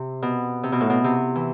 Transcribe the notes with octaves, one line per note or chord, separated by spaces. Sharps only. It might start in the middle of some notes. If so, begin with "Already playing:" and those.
Already playing: C3
B2
C3
B2
A2
B2
C3
E3